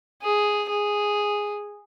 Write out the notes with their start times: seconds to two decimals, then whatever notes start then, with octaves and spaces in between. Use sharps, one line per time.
0.22 G#4
0.69 G#4